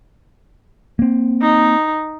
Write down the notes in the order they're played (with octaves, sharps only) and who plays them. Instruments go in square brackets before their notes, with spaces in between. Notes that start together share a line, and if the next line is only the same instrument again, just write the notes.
[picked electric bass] A#3 C4
[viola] D#4